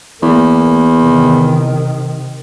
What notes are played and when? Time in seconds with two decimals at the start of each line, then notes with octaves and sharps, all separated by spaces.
0.22 E2 A#3
1.00 C3 D#3